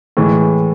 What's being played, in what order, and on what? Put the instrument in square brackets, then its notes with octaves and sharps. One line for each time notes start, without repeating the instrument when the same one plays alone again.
[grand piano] A2 E3 G#3